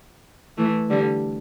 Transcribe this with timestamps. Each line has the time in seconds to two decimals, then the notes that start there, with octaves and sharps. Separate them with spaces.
0.58 E3 A3
0.90 D3 G3